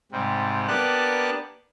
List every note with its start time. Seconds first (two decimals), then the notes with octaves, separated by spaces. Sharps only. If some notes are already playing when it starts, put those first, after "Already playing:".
0.12 G#2 C3 G3
0.68 A#3 B3 D4 G4 A5 F#6